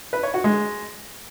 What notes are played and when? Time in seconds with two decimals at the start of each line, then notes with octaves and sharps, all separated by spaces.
0.13 B4
0.23 C#5
0.34 F#4
0.44 G#3